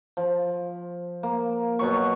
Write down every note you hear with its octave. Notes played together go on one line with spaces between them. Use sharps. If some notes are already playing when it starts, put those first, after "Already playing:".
F3
A#3
B2 F#3 C#6